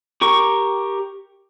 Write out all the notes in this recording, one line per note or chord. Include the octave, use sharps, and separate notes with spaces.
G4 A#4 C#6